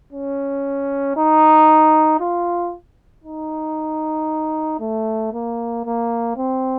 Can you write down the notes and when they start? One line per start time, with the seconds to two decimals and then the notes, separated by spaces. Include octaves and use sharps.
0.13 C#4
1.17 D#4
2.20 F4
3.24 D#4
4.80 A3
5.33 A#3
5.85 A#3
6.37 C4